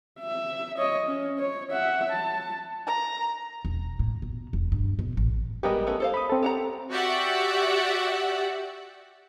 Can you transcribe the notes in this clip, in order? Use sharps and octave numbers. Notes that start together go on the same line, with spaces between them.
E5
C#5 D#5
C#4
C#5
E5 F#5
A5
A#5
E1
A2
B2
E1
G2
B2
A1
G3 G#3 B3 G4 A#4 D#5
A3 B3 C#4
A4 C5 F5
B5 D#6
C4 A4
G4 F#5 A#5
F#4 G4 D5 E5 F#5